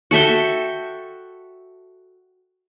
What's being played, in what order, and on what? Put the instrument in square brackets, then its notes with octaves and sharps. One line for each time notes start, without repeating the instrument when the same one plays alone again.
[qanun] F#4 A4 E5 G5